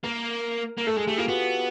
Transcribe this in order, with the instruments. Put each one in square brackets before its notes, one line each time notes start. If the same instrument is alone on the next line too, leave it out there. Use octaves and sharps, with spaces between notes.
[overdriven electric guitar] A#3 [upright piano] A#4
[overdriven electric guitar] A#3
[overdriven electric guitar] A3 [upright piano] A4
[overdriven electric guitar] G#3 [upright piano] G#4
[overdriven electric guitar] A3 [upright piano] G4
[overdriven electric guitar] A#3 [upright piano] F4
[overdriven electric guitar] B3 [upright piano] F#4